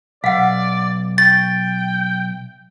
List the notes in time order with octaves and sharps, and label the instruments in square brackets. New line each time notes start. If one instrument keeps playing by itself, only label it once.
[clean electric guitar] B1 [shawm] D5 [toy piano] F5 F#5
[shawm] G5 [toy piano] C#6 [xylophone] A6